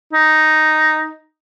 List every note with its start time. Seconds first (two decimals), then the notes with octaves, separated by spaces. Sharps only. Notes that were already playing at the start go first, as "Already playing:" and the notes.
0.13 D#4